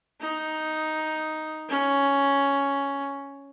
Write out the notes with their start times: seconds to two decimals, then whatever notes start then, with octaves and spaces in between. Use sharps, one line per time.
0.21 D#4
1.69 C#4